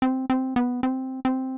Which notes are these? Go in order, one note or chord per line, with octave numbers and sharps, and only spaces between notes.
C4
C4
B3
C4
C4